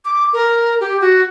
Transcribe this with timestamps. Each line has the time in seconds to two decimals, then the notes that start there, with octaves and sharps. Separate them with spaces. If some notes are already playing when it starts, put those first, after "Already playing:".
0.05 D6
0.33 A#4
0.80 G4
1.01 F#4